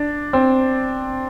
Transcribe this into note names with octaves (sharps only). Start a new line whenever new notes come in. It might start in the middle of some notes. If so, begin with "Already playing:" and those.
Already playing: D4
C4